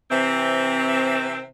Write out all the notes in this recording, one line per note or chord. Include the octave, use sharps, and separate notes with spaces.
C3 E3 C4